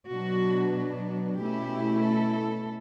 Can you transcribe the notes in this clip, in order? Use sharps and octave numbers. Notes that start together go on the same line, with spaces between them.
B2 F#3 B3 D4 F#4
B2 A3 C#4 E4 G4
A4